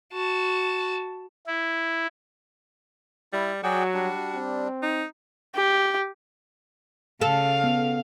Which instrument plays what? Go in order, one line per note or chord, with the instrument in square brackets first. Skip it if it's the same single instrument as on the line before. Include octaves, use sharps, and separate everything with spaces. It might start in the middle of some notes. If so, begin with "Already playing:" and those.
[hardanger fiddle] F#4 A5
[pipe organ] E4
[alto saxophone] G3 [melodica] E4
[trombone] F#3 [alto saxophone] F#4 [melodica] G#4 D5 G5
[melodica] G3 D4
[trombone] C4
[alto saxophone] D#4
[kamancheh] G4
[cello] C#3 [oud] A4 [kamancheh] F5
[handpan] B3